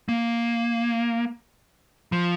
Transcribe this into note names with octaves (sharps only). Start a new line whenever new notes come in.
A#3
F3